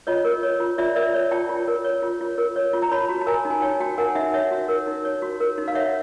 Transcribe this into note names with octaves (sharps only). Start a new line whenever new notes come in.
F4 C#5 D#5
A#4
C#5
F4
F4 D5 E5
A#4 D5 E5
C#5
F4 G5 A5
F4
A#4
C#5
F4
F4
A#4
C#5
F4
A#5
C#5 A5 B5
F#4
A5
A#4 G#5 A#5
D#4
G#5
C#5 G5 A5
F#4 G5 A5
A#4 F#5 G#5
D#4 E5 F#5
C#5 E5 F#5
F#4
A#4
D#4
C#5
F#4
A#4
D#4
F5
C#5 E5 F#5